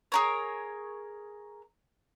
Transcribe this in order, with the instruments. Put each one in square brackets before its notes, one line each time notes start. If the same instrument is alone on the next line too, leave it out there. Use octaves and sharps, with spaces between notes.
[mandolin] G#4 A#4 C#5